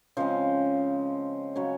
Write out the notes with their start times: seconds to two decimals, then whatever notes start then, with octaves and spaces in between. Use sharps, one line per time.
0.17 C#3 F3 G#3 C4 C5
1.56 C#3 F#3 C#4 C#5